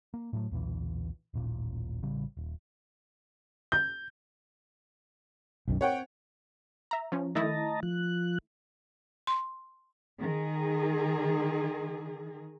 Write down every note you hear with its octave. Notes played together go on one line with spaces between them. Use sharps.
A#3
A2 F#3 A3
B1 E2 A#2 E3
D#1 A1 A#2
A1 C#3 G3
D#1
G6
B1 F#2 D#3
C4 C#5 F#5 G5
E5 A#5
F3 C#4
D#3 A3 E4 D#5 A5 A#5
F3 F#6
C6
D#3 G#4